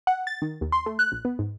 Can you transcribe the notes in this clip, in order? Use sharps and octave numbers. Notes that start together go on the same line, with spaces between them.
F#5
A6
D#3
D#2
C6
A3
F#6
A#1
B3
G#2